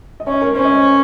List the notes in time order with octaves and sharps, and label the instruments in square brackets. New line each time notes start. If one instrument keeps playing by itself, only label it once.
[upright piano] D#5
[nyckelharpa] C#4 [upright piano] C#5
[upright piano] A#4
[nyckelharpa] C#4 [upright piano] C5
[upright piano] D#5